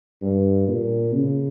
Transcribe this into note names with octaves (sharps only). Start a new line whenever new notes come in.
G2
A#2
C#3